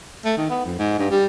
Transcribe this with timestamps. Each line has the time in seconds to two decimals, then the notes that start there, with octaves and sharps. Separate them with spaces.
0.25 A3
0.37 D#3
0.50 B3
0.65 F2
0.79 G#2
0.99 G2
1.11 G3